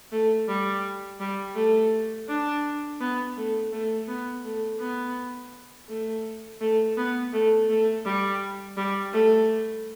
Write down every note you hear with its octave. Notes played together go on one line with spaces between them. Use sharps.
A3
G3
G3
A3
D4
B3
A3
A3
B3
A3
B3
A3
A3
B3
A3
A3
G3
G3
A3